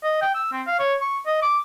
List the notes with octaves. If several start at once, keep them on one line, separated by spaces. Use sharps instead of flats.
D#5
G5
E6
C4
F5
C#5
C#6
D#5
D6